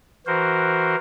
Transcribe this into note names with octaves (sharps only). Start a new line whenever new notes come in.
E3 F#4 A#4 C5